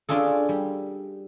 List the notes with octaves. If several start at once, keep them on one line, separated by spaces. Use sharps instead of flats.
C#4 D4 F4 G#4 A4
G3